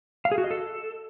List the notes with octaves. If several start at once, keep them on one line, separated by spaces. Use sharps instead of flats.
F5
G#4
F#4
D#5
A4